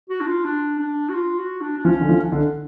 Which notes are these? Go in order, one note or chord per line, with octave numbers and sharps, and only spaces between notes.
F#4
D4
F4
D4
D4
F#4
F4
F#4
D4
D4
F3 C#4
D3
F3
D4
D3